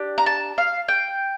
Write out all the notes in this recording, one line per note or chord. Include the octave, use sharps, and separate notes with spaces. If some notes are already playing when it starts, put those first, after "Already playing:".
Already playing: D4 G4
A#5
A5
F5
G5